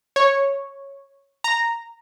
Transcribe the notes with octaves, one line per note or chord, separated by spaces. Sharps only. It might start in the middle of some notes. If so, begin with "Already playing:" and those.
C#5
A#5